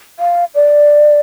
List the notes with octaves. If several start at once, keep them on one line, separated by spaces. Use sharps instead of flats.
F5
D5